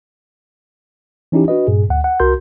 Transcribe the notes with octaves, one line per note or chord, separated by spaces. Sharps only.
E3 C#4 D#4 E4 G4
D4 F#4 B4 D#5
G2 A#2 G#4
D2 F#5
F#5
C2 F#4 A#4 C6 G6